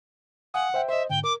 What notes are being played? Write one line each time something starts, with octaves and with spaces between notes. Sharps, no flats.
F5 F#5 G#5 D#6
C5 E5 G5
C5 D#5 E5
G#2 D3 G5
A#4 D6